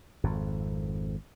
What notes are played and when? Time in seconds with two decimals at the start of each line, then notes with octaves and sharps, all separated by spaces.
0.24 G#1 F2